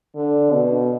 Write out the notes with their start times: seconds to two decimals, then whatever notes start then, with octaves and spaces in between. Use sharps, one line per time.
0.16 D3
0.52 B2